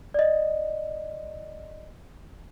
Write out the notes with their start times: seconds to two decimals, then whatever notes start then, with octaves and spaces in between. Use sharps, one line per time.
0.14 D5 D#5